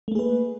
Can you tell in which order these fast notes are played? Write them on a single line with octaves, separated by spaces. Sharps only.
A3 A#3 G#4 B4